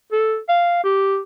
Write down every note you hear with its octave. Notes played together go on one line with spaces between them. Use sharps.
A4
F5
G4